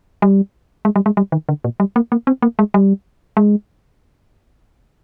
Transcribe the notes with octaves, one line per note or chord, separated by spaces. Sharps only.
G3
G#3
G3
G#3
G3
D#3
D3
A#2
G3
A#3
A#3
C4
A#3
G#3
G3
G#3